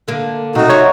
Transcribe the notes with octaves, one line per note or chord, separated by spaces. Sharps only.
D3 A#3
C3 A3 D#4 F#4
F4 C#5 E5